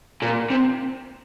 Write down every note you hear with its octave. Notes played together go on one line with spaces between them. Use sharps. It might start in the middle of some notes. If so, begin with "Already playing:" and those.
A#2
C3